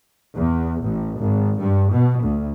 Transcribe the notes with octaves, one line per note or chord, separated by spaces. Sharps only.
E2
A1
G#1
G2
B2
D2